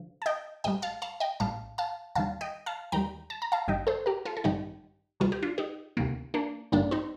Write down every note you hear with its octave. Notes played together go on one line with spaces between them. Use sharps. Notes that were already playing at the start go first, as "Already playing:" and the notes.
Already playing: D3 F3
A5
D#5 G5
A#1 A2 G3 D#5 G5
F5 A5
F5 A5
D#5 G5
A#1 A2 G3 F5 A5
F5 A5
D#2 D#3 G3 F5 A5
D#5 G5
F5 A5
D#2 D#3 G3 G5 A#5
A5
A#5
F5 A5
A1 G2 D#3 G3 D#5 G5
A4 C5
G4 A#4
F4 A4
A4
A1 G2 D#3 G3 D#4 G4
D2 C3 D#3 G3 F4
G4
D4 F4
D#4 G4
D2 C3 D#3 G3 A#3
A#3 D4
A1 G2 D3 G3 A#3 D4
C4 D#4